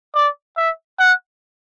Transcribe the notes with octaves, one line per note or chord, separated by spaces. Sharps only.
D5
E5
F#5